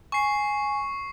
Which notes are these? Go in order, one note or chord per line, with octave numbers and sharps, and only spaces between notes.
G#5 C#6 C7